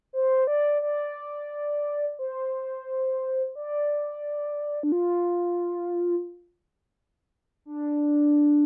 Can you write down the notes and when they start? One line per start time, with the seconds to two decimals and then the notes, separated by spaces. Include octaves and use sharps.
0.13 C5
0.47 D5
0.82 D5
2.19 C5
3.55 D5
4.83 D4
4.92 F4
7.65 D4